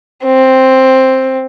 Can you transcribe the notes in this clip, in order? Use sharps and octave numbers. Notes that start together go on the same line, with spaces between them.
C4